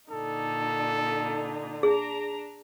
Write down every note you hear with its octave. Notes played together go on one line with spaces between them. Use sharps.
A#2 D3 D#4 A4
D4 G#4 A#5